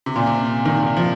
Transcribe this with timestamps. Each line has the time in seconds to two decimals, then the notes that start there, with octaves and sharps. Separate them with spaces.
0.06 C3
0.16 A#2
0.26 C3
0.65 D#3
0.97 F3